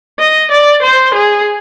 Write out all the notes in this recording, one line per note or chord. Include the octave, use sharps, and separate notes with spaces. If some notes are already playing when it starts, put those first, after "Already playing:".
D#5
D5
C5
G#4